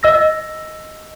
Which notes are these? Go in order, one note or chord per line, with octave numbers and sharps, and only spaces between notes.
D#5 E6 A#6